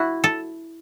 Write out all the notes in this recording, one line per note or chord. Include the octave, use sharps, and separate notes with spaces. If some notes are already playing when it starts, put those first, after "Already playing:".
Already playing: E4 F#4
A4